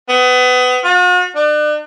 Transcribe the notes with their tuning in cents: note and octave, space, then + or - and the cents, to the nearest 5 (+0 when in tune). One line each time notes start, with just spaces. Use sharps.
B3 +30
F#4 -45
D4 +40